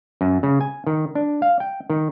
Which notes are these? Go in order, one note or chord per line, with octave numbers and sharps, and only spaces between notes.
F#2
C#3
G#5
D#3
D4
F5
G5
D#3